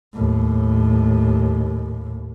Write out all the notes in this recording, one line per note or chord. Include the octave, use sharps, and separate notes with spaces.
D#2 A2